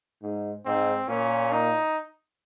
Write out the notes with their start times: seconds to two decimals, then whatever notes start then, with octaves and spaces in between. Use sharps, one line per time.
0.23 G#2
0.65 G#2 C4
1.08 A#2 C#4
1.52 D#4